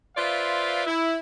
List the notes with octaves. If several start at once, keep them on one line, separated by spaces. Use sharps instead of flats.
F4 B4 C5 D5 E5 F5
E4